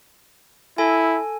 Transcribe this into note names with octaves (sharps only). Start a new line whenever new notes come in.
E4 A4 G#5